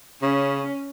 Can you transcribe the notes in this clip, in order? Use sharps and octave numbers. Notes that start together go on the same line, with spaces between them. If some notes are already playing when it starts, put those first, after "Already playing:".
C#3 C#4